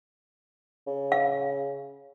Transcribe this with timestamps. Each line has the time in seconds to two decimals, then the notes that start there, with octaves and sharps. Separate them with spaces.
0.87 C#3
1.12 F5